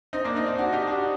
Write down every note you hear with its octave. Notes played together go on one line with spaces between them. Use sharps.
C4 D#4
A#3 D4
C4 D#4
C4 D#4
D4 F#4
D#4 G4
D4 F#4